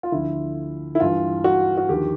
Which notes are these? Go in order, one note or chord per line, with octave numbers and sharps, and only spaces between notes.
F4
D2 D3 F3 E4
E4
G2 E3 F4
F#4
F#4
D#2 D3 F3 G4